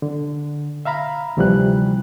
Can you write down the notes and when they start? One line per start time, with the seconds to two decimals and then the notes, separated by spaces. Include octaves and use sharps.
0.02 D3
0.85 E5 F5 A#5 B5
1.37 D2 C3 E3 F3 G3 F#6